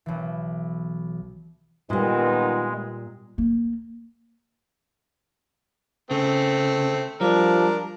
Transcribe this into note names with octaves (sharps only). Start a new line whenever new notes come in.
B1 E3
A#2 D#3 G3 G#3 B3 F4
A#3
C#3 A3 C4
F3 G3 D4 A#4